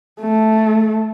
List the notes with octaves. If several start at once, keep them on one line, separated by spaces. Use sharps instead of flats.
A3